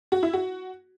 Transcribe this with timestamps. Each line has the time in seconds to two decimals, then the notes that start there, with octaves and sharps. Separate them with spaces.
0.12 F#4
0.23 E4
0.33 F#4